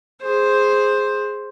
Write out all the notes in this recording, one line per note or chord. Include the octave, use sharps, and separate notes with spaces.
G#4 C5